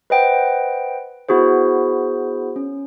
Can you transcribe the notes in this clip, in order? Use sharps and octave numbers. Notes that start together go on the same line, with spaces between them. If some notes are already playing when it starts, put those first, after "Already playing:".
B4 C5 D#5 F#5 G5
B3 E4 F#4 G#4 C5
C#4